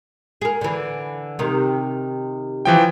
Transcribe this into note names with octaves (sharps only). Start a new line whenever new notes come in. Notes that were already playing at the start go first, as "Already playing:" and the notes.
G#4 A#4
D3 E3
C3 D#3
E3 F3 G5